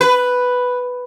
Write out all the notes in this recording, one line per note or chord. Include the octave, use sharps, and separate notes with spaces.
B4